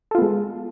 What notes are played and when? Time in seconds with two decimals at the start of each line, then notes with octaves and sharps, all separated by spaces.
0.11 A4
0.15 F4
0.18 B3
0.22 G#3